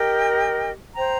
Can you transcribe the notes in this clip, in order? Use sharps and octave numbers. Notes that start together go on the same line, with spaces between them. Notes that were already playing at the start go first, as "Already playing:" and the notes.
Already playing: G4 A#4 D#5 G5
C5 G5 A#5